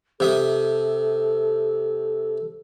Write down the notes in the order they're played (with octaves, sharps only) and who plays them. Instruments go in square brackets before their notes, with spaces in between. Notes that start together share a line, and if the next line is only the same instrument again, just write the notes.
[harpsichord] C3 E5 D#6 [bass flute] A4